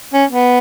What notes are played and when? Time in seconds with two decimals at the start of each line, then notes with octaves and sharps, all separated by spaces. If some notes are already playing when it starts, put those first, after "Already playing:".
0.14 C#4
0.30 B3